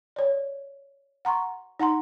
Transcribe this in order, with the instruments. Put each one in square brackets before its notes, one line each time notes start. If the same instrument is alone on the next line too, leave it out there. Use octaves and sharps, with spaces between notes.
[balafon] C#5 D5
F#5 A#5 C6 C#6
D#4 F#5 A#5 C6